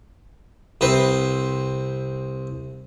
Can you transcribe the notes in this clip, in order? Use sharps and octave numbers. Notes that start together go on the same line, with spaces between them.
C2 C4 B4 C5